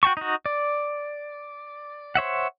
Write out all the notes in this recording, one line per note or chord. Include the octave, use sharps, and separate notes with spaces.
F#4 G5 A5 C#6
D#4 F#4
D5
C5 C#5 E5 F#5